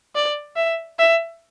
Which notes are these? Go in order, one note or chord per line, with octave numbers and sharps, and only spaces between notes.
D5
E5
E5